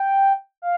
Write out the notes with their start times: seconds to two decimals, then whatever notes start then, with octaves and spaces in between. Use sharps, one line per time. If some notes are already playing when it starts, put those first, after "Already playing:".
Already playing: G5
0.62 F5